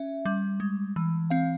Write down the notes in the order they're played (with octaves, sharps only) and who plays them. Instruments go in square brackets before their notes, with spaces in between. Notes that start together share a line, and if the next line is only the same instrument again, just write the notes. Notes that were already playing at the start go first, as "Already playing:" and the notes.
Already playing: [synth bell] C#4 E5
G3
G#3
E3
C4 F5